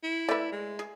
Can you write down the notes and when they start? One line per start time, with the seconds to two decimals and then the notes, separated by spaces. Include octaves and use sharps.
0.03 E4
0.29 A3 B4 D5 E5
0.52 G#3
0.79 G#4